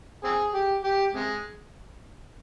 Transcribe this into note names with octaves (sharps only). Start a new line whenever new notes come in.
C4 G#4
G4
G4
C3 G#3